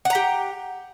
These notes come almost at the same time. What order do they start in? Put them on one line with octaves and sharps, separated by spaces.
F#5 A#5 G4